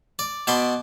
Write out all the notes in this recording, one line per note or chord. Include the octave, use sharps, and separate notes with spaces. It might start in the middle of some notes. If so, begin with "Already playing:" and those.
D5
B2 D5 B5 C6